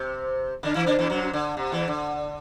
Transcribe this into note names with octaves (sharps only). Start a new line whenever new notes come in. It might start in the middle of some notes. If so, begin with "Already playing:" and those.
Already playing: C3 C4
D3 D4
E3 E4
D3 D4
E2 E3
F#2 F#3
D3
C3
E2 E3
D3